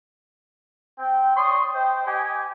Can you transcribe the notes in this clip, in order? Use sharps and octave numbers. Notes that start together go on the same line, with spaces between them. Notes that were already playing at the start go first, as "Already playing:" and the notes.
C4 G5
C#5 D5 C6 C#6 D#6
C5 D#5 G5
G4 D#5 G5 G#5